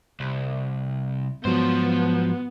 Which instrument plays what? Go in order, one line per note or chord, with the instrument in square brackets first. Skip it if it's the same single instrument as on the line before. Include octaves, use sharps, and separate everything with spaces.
[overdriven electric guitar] C2
[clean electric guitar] G#2 F#3 [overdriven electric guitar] F3 C5 [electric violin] B3